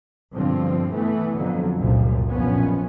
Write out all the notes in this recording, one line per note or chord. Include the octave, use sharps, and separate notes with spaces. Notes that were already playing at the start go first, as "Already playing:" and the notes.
G2 B2 D3 F3 C4
E3 A3 B3
F2 D3 F#3
F1 C#2 F#2 A#2 F3
A#1 F#2 B2 F3 B3 C#4